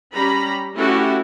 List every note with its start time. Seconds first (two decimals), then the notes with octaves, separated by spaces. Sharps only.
0.13 G3 C#4 A#5 B5
0.74 A3 C#4 E4 F#4 G4